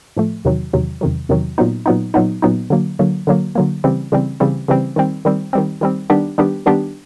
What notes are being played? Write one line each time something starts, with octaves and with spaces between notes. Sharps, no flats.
A2 F3 A3
E2 C3 D#3 F#3
E2 C3 D#3 F#3
E2 C3 D#3 F#3
E2 C3 D#3 F#3
A#2 F#3 B3 D#4
A#2 F#3 B3 D#4
A#2 F#3 B3 D#4
A#2 F#3 B3 D#4
D3 F#3 A#3
D3 F#3 A#3
D3 F#3 A#3
D3 F#3 A#3
C#3 E3 G3 C4
C#3 E3 G3 C4
C#3 E3 G3 C4
C#3 E3 G3 C4
D#3 G3 C4
D#3 G3 C4
D#3 G3 C4
D#3 G3 C4
D#3 G3 B3 D4 G4
D#3 G3 B3 D4 G4
D#3 G3 B3 D4 G4